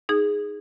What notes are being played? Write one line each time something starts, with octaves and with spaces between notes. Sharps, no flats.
D#4 G#4